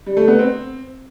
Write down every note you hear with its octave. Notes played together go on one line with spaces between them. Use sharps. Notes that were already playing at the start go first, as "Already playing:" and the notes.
G3
A3
B3
C4